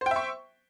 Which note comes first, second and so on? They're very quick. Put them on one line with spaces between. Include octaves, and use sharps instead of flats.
C5 G5 E5 C#6